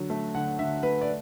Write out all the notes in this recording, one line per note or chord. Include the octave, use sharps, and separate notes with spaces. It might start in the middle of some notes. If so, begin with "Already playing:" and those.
Already playing: D3 F#3
A3
D3 F#5
D3 E5
A3 B4
D5